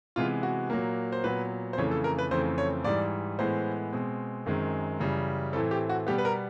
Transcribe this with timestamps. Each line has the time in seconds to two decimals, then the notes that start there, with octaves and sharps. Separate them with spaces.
0.16 C3 E3 G#3 B3 F4
0.43 F#4
0.70 A#2 F#3 A#3
1.12 C5
1.24 A#2 F#3 B3 B4
1.73 C5
1.77 F2 C#3 E3 A3 C#5
1.91 A4
2.04 A#4
2.19 B4
2.31 F2 C#3 E3 A3 C4 C5
2.58 C#5
2.84 G#2 E3 G3 D5
3.39 A2 E3 G#3 B3 C5
3.93 B2 G#3 C4
4.46 F#2 D#3 G#3 C4
5.00 F#2 C#3 E3 G3
5.53 A2 E3 A3 C4 A4
5.71 G4
5.90 F#4
6.07 B2 G3 B3 G4
6.18 B4
6.25 A#4